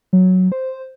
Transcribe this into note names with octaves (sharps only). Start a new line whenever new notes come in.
F#3
C5